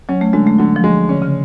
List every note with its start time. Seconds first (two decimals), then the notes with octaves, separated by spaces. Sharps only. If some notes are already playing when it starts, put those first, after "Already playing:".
0.09 F#3 C#4
0.21 A3
0.33 D3 G#3
0.47 A3
0.58 D3 F#3
0.76 F3
0.84 G#3
1.09 D3 C#4
1.22 C#3